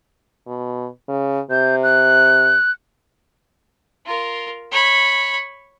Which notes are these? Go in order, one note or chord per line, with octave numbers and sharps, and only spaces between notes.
B2
C#3
C3 G6
F#6
F4 A#4
C#5 B5